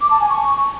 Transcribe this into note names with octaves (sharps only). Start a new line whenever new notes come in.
D6
A5
G#5
C#6